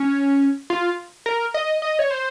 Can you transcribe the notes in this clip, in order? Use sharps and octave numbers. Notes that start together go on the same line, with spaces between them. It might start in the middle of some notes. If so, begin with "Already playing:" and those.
Already playing: C#4
F4
A#4
D#5
D#5
C#5
C5